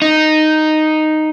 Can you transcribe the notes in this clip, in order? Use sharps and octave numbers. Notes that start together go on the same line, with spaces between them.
D#4